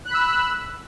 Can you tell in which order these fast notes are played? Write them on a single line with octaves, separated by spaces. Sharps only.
F#6 B5 E6